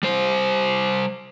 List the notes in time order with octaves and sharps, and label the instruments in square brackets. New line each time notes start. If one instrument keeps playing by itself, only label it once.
[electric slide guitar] G3 C5